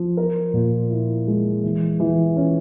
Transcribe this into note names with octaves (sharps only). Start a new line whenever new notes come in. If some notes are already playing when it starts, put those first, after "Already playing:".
Already playing: F3
A#4
A#2
E4
G#3
E3
E3
C#4